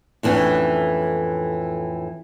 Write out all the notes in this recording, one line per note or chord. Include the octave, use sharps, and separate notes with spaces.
F2 A2 E3 B3 C#4 D4